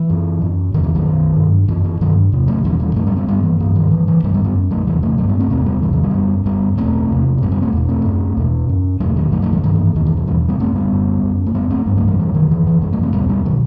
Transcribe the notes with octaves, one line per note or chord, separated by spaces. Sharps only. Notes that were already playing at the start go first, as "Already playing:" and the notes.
Already playing: E3
F#2
F#2
E2 C3 D#3
E3
D#3 F#3
F#2
G2
F#2 E3
E3
G2 D#3 F#3
E2 C3
F#3 A3
E2 B2 E3 G3
E3 G3
F#2 F#3 A3
G3 B3
G3 B3
G2 G3 B3
E3
G2 E3
D#3 F#3
G2 E3
E3
G2 E3 G3
G3 B3
G3 B3
F#2
F#3 A3
E2 C3 E3 G3
F#3 A3
G2 F#3 A3
G3 B3
A3 C4
E2 C3 A3 C4
G3 B3
E2 C3 E3 G3
D#3 F#3
G3 B3
F#2
F#2 G3 B3
E2 B2 A3 C4
E2 C3
F#2 G3 B3
G3 B3
A3 C4
E2 B2
A3 C4
F#2
E2 B2
F#2
E2 B2 F#3 A3
D#3 F#3
F#2 F#3 A3
F#3 A3
E3 G3
G2 D#3 F#3
E3
E3
E2 B2 D#3
E3
E3
E2 B2 E3 G3
G3 B3
F#2 A3 C4
G3 B3
F#2
F#2
A3
F#2 G3 B3
A3 C4
G2 G3 B3
F#3 A3
E3 G3
F#2 E3 G3
D#3 F#3
F#2 E3
E3
F#2 E3 G3
F#3 A3
A3 C4
E2 B2 G3 B3
G3 B3
B2 D#3 F#3